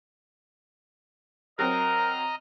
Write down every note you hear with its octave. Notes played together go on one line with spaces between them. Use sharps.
F#3 C4 A#4 D#5 A#5 F6